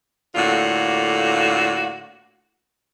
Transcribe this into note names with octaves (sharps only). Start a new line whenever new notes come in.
A2 D3 A#3 F4 F#4